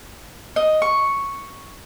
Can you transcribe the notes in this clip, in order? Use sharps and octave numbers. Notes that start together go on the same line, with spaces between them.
D#5
C#6